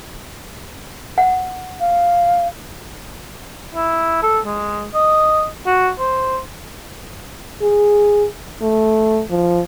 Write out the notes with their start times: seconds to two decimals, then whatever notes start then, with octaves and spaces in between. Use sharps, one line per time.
1.18 F#5
1.80 F5
3.75 E4
4.23 A4
4.46 G#3
4.94 D#5
5.66 F#4
5.99 C5
7.62 G#4
8.62 A3
9.30 F3